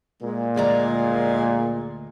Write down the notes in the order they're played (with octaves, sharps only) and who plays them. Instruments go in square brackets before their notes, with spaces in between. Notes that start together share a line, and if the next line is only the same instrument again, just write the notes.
[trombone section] A#2 [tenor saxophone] G#3
[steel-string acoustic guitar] D2 D5 A#5 [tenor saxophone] G#3